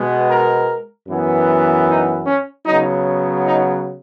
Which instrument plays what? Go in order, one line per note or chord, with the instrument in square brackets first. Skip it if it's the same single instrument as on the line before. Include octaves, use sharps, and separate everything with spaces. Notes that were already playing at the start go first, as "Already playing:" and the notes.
Already playing: [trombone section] B2 G#3 B3
A#4
F#2 E3 B3
D#4
C#4
C#3 F#3 B3 D#4
D#4